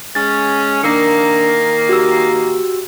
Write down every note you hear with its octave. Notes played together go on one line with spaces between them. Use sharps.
G#3 C#4 A6
D#3 A#3 D4 E6 C#7
F#4 G4 E6